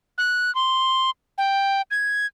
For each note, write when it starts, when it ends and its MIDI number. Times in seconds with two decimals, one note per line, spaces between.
0.18 0.53 90
0.55 1.10 84
1.38 1.82 79
1.91 2.26 92